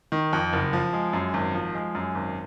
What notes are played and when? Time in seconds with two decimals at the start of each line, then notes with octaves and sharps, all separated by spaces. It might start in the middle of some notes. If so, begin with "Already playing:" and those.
0.12 D#3
0.33 F2
0.53 F#1
0.73 F3
0.93 G#3
1.13 F#2
1.34 G#1
1.55 F3
1.74 G#3
1.95 F#2
2.15 G#1